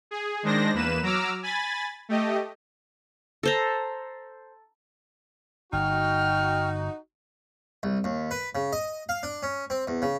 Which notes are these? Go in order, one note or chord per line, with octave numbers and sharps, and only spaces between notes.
G#4
D#3 G#3 D4 C5 A#6
E2 A#3 B4 E7
F#3 A#5 D6 E6 F6
G#5 B5 A6
A3 G4 D#5
A4 C5 A#5
G1 D#4 F#4 G5 F6
C2
D#2
B4
C#3
D#5
F5
D4
C#4
C4
E2
C#3